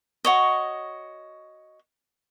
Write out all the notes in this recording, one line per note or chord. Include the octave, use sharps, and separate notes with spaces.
F#4 C#5 D#5